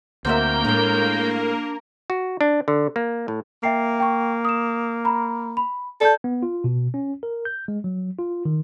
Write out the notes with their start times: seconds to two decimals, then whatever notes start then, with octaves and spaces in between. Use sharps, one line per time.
0.25 D2 A#3 C4 F#4 A#4 E5 G6
0.65 A2 G#3 D4
2.10 F#4
2.41 D4
2.68 D3
2.96 A#3
3.28 A2
3.63 A#3 E5 G5 C7
4.00 G5 C#6
4.45 D#6 E7
5.05 A#5 B5
5.57 B5
6.01 A4 D5 A5 G6
6.24 B3
6.43 F4
6.64 B2
6.94 C#4
7.23 A#4
7.45 G6
7.68 G#3
7.84 F#3
8.19 F4
8.45 D#3